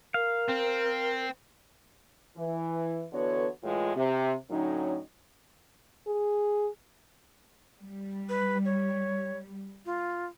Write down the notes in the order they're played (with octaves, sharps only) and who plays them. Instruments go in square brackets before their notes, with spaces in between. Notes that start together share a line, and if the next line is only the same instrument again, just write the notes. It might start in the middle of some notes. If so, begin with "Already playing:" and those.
[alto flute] A#4 [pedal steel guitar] F5
[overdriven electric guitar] C4
[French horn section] E3
D3 E3 B3 F#4 A4 C#5
A2 E3 G#3 F4
C3
A2 D3 F#3 C#4 D#4
[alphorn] G#4
[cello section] G3
[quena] B4
C#5
F4